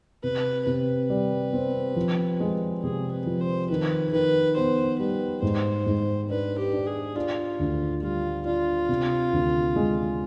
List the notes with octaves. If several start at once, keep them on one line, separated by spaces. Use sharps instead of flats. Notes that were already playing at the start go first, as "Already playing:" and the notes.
C3 B4
C3 B4
G3
C4
F3
G#3
C3 G#4
B4
F3
C5
D#3 B4
D#3 B4
B3 C5
G3 B4
G#2 C5
G#2
D4 B4
G4
D4
G#4
D4 F4
D2
G3 F4
D4 F4
C3
D2
G#3